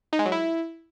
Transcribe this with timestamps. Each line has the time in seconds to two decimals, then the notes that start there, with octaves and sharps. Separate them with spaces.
0.13 D#4
0.19 G#3
0.25 F#3
0.32 E4